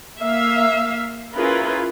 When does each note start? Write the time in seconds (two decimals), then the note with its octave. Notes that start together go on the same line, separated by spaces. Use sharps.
0.20 A#3 E5 F5
1.35 C#4 E4 F4 G#4 A#4 B4